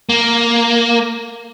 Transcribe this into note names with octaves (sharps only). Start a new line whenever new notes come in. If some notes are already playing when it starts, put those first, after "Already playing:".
A#3